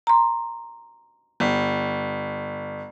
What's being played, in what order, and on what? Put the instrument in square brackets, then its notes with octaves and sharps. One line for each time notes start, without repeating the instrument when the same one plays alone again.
[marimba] A#5 C6
[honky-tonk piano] G1